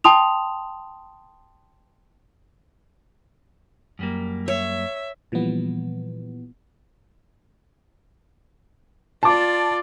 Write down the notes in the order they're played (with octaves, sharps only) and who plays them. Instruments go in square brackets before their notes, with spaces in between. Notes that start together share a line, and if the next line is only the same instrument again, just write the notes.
[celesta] G5 A5 C6 D#6 F7
[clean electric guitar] F#2 G3 A#3
[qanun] C#5 [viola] E5
[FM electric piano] A#2 E3 F3 G3 B3
[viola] F4 D5 [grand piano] A5 D6